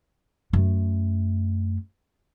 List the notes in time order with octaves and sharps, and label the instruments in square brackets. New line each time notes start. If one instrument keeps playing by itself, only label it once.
[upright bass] F#2 A3